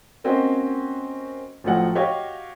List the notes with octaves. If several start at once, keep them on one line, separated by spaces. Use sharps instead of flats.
A#3 C4 C#4 F#4 C5 D#5
A1 A2 F3 F#3 F#5
F#4 G4 C#5 D#5 F5